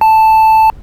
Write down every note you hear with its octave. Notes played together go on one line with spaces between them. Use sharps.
A5